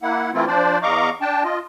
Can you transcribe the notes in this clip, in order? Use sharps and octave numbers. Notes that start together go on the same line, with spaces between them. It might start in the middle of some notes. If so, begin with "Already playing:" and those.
A#3 E4 F#5
E3 A3 C4 E4 F4
F3 D4 C5 D5
E2 D#5 F5 A#5 C#6 D6
D4 G5 A5
F4 D#5